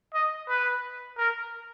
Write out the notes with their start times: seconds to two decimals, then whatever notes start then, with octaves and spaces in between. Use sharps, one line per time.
0.14 D#5
0.48 B4
1.18 A#4